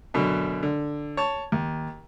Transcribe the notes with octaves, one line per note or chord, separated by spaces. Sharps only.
F#2 B2 D3
D3
C#5 A5
D#2